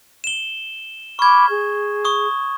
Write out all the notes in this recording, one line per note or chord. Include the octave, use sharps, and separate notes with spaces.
E7 G7
B5 C#6 D6 F6 G#6
G#4
C#6 D#6